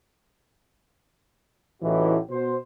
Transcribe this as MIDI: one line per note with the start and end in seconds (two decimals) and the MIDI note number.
1.83 2.17 33
1.83 2.17 45
1.83 2.17 52
1.83 2.17 63
1.83 2.17 66
1.83 2.17 67
2.30 2.56 47
2.30 2.56 72